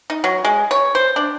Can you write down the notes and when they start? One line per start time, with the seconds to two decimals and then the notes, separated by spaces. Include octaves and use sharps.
0.10 D#4
0.24 F#3
0.45 G#3
0.71 C#5
0.95 C5
1.16 D4